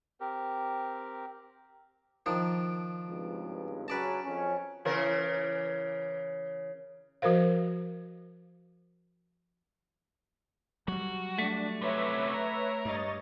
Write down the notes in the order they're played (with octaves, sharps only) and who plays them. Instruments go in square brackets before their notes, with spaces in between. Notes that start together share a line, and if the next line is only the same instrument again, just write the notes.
[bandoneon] C4 G4 A#4
[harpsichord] D#3 F3 D4
[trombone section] G#1 C#2 G2
[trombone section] C#3 F#3 C#4 [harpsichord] B4 D5 A5
[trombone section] F2 C#4
[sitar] C#3 E3 A#4
[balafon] F3 F#4 A#4 C5 F5
[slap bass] F#3 G3 [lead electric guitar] F#4
[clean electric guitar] A3 [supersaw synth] D4
[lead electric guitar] F#2 C3 [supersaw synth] B4 C#5 E5
[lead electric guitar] A#4
[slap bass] G2 [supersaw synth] C#5 D#5 A6